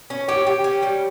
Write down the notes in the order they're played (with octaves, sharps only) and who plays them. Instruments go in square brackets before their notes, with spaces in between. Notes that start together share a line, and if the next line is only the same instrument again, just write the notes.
[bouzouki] C#4
[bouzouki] G4 [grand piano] C#5
[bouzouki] G4
C#4
G3